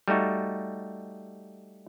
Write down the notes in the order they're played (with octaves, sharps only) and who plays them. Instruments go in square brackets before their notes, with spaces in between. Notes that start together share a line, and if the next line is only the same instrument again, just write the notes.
[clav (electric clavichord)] G3 A3 D#4 F#4